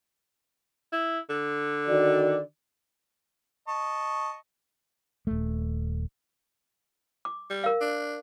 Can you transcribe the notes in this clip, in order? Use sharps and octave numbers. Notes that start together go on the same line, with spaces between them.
E4
D3
D#3 F#4 D5
D#5 A5 C#6
D#1 A3
D6
G3
A#4 F5
D4